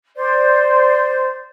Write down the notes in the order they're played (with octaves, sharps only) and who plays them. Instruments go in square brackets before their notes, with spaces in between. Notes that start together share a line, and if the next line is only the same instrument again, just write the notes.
[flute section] C5 D5